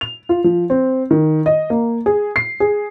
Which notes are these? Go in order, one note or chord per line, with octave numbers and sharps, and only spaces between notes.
F7
F4
F3
C4
D#3
D#5
A#3
G#4
C7
G#4